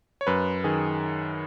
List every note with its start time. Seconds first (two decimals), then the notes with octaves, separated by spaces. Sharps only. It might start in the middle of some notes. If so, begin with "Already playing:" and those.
0.21 C#5
0.27 F#2 B4
0.64 D#3 G#4